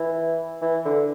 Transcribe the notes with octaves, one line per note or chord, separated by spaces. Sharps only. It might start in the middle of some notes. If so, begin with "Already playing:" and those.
Already playing: E3
E3
D3